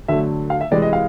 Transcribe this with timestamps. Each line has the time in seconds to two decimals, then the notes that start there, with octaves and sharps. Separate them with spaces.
0.08 D3 F#3 A3 E5
0.50 F5
0.61 E5
0.71 C3 E3 G#3 D5
0.82 D#5
0.93 F5